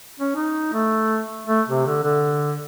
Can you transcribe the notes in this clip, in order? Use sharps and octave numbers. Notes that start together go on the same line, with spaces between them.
C#4
D#4
A3
A3
C3
D3
D3